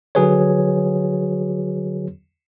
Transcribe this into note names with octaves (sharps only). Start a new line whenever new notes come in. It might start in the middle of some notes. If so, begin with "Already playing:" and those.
D3 F#3 F#4 G#4 B4 C#5